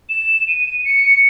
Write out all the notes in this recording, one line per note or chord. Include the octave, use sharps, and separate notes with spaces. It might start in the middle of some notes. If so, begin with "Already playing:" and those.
E7
D#7
C#7